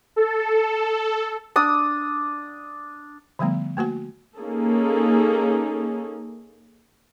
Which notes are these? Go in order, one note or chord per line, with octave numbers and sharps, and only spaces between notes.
A4
D4 D#6
D3 F3 G3 A3 B3
A3 A#3 F#4 F#5
A#3 C#4 D#4 G#4 A4